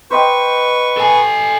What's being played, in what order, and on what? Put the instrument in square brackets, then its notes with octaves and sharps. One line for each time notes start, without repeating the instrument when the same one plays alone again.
[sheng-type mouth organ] B4 C#6 [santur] C5 D#5 G5
[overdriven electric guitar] A4 G#5